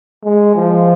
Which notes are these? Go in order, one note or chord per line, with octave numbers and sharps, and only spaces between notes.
G#3
F3